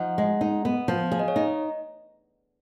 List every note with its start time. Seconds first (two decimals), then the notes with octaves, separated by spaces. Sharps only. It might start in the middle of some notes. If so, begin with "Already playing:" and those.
Already playing: F3 D#4 F#5
0.18 G#3
0.41 D#4
0.65 B3
0.88 F3
1.12 G#4 F5
1.19 D#5
1.28 C#5
1.36 D#4 D#5